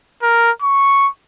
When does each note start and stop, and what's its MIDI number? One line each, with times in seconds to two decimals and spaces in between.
0.23 0.51 70
0.62 1.08 85